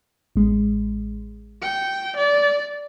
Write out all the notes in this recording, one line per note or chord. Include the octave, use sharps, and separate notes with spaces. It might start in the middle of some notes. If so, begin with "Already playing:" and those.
A1 G#3
G5 C#7
D5